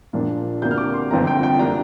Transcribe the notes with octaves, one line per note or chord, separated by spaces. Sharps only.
A#1 A#2 F3 A#3 D4
D2 C3 A#3 D4 G6
F6
D6
C6
G1 F2 F3 C4 A#5
G5
G5
C3 A#3 D4 A#5